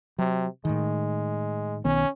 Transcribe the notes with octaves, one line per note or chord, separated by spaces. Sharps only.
C3 F#3
A2 D#3 G#3
B1 D#3 B3 C#4